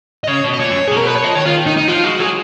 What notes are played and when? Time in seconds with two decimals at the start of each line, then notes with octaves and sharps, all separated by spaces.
0.24 D#5
0.28 C#3 C#5
0.44 B2
0.54 D#5
0.60 A#2 C#5
0.71 F#2
0.87 G#4
0.91 B2
0.97 A#4
1.06 B4
1.15 C#5
1.24 F3 D#5
1.35 D#3 C#5
1.46 D#3 F4
1.66 D#4
1.77 D#4
1.88 F3 F4
2.04 G#3 F#4
2.20 F#3 G#4